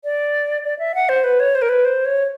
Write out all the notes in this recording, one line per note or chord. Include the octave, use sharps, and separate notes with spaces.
D5
D5
E5
F#5
C5
B4
C#5
C5
A#4
B4
C5
C#5